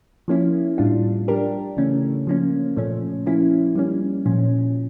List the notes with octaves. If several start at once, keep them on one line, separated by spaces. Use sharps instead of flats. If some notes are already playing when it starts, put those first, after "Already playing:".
F3 A#3 C#4 E4
A2 G3 D4 F4
G3 D4 G4 A#4
C#3 E3 A3 C#4
F3 A#3 C#4
A#2 F3 A3 C#4
F3 A#3 C#4 E4
G3 A#3 C#4
A#2 F3 C#4